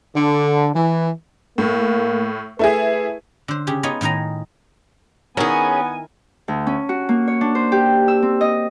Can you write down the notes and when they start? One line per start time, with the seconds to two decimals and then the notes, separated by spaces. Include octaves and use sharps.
0.15 D3
0.75 E3
1.58 A2 A#3
2.59 A3 E4 G#4 B4
3.48 D3 C5
3.67 C#3 G4 G#4
3.83 B3 D#4 F4 C#5 G#5
4.01 A2 D#3 D#4 G#5 A#5
5.37 D#3 B3 C#4 E4 G#4 A#4 G#5
6.48 D2
6.67 C#4
6.89 F#4
7.09 A#3
7.28 C#5
7.41 D4
7.55 C5
7.72 G4
8.08 E6
8.23 C4
8.41 D#5